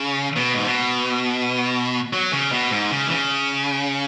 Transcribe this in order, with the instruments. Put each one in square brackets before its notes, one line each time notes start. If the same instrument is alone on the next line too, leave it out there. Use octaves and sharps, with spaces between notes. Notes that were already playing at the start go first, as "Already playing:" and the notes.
Already playing: [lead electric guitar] C#3
B2
G#2
B2
F#3
C#3
B2
G#2
C#3
E3
C#3